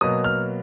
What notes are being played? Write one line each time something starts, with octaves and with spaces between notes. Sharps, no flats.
B2 F#3 A#3 D#6
F6